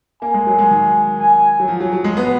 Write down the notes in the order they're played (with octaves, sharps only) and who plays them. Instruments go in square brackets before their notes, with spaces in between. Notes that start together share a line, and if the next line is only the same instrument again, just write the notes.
[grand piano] A#3 [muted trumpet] G#5
[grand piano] G#3
F#3
G#3
D#3
[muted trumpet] G#5
[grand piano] F#3
F3
F#3
F#3
G#3
B3